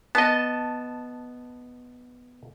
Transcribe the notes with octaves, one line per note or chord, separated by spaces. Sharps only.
B3 D#5 A5